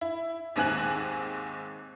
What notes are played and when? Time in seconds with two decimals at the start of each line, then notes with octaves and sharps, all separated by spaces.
0.01 E4
0.56 D#2 G#2 C4 G#5 F#6 F#7